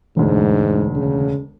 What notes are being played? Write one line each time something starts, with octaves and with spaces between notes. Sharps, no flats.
E1 D2 G#2
C#3